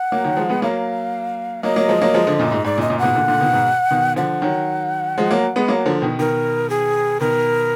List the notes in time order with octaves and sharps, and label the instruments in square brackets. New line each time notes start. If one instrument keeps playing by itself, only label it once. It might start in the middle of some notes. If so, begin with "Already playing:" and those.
Already playing: [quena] F#5
[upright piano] F#3 A#3
D#3 F#3
F3 G#3
G#3 B3
[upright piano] F#3 A#3 [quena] F5
[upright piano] F#3 A#3 [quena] D#5
[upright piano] F#3 A#3
F3 G#3
F#3 A#3
F3 G#3
D3 F3
F#2 A#2
G#2
[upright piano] G#2 [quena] D5
[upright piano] F#2 A#2
[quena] D#5
[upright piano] F#2 A#2
[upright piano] G#2 B2 [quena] F#5
[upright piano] A#2 D3
A#2 D3
B2 D#3
G#2 B2
B2 D#3
[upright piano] D3 F3 [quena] F#5
[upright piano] D#3 F#3
F3 G#3
F#3 A#3
G#3 B3
F#3 A#3
D3 F3
B2 D#3
[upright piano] B2 D#3 [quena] A#4
[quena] G#4
[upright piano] B2 D#3 [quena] A#4